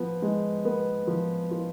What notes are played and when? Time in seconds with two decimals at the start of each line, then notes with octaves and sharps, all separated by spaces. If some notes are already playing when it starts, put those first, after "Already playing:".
Already playing: F3 B3
0.22 G#3
0.65 B3
1.07 F3
1.51 F4